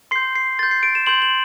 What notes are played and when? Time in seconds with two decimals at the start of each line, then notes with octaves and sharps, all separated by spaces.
0.11 C6 G6 C7
0.36 C7
0.59 C6 A6
0.63 G6
0.71 C7
0.83 D7
0.95 E7
1.06 C6 G6 F#7
1.22 F#7